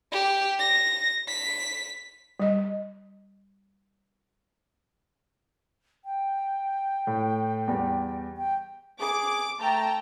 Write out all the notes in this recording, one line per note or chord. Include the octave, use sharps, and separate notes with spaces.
G4
A#6
B6
G3 D#5
G5
A2
E2 G3
G5
G#4 D6
A3 G5 A5 A#5